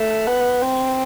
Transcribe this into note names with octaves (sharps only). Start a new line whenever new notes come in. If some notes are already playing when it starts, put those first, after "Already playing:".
Already playing: A3
B3
C4